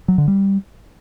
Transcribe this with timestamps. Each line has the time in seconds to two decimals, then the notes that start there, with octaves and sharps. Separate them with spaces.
0.08 F#3
0.18 D3
0.28 G3